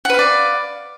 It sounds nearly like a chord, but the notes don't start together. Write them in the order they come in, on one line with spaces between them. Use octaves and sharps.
F#5 B4 F5 D5